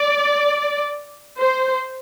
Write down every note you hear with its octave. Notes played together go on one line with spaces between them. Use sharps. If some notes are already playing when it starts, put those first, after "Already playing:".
Already playing: D5
C5